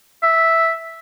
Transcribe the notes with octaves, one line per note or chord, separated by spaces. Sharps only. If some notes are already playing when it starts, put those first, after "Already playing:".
E5